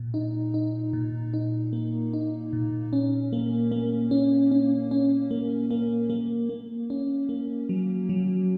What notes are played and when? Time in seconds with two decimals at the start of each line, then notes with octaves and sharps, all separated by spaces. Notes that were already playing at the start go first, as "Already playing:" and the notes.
Already playing: A#2
0.14 D#4
0.54 D#4
0.93 A#2
1.33 D#4
1.73 A#3
2.13 D#4
2.53 A#2
2.93 C#4
3.33 A#3
3.72 A#3
4.11 C#4
4.51 C#4
4.91 C#4
5.31 A#3
5.71 A#3
6.10 A#3
6.49 A#3
6.90 C#4
7.29 A#3
7.69 F#3
8.09 F#3